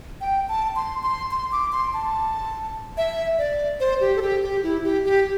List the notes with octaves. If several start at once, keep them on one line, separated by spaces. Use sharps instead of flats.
G5
A5
C6
C6
C6
D6
C6
A5
E5
D5
C5
G4
A4
G4
G4
E4
G4
G4